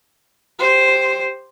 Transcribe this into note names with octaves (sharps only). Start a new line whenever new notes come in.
G4 C5